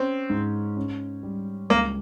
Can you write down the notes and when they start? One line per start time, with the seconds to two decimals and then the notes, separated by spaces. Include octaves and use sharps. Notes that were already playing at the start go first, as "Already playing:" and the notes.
Already playing: C4 C#4
0.30 G#2
0.76 C#4
1.23 G3
1.70 C#2 A#3